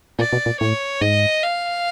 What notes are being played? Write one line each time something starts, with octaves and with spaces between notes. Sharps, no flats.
A#2 D5
B2
A#2
A2 C#5
G#2 D#5
F5